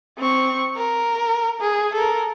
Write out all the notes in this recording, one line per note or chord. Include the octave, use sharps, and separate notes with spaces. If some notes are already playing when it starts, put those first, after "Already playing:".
C4 C#6
A#4
G#4
A4 A#4